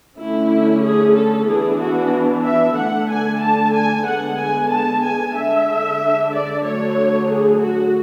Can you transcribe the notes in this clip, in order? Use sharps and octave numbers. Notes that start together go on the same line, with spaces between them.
D3 A3 C#4 E4
G#4
A4
E3 B3 D4 G#4
F#4
E5
D3 A3 D4 F#5
G#5
A5
G#5
D3 G#3 B3 F#5
G#5
A5
G#5
D3 G#3 D4 E5
D5
D3 F#3 A3 C#5
G#4
F#4